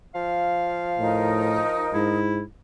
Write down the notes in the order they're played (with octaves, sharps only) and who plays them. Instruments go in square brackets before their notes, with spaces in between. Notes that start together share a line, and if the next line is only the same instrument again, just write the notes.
[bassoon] F3 [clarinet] F5
[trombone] A2 [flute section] D#4 A#4
[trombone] G#2 [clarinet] E4